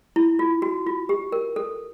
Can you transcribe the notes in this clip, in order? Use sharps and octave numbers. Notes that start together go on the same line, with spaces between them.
E4
F4
F#4
F4
G4
A#4
A4